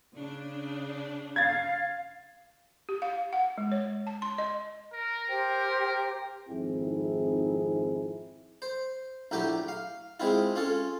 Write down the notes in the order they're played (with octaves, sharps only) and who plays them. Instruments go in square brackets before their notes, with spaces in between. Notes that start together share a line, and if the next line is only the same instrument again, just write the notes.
[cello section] C#3 D4
[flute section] F5 [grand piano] G#6 A6
[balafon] G4
F5
F#5
G#3
C#5
A5
C6
D#5
[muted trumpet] A#4
[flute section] G4 C5 G5
[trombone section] G#1 F2 C4 D#4 E4 G#4
[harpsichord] C5
A#1 A2 F#3 G4 G5 D6
F5
G#3 C4 E4 F4
C#4 F4 A4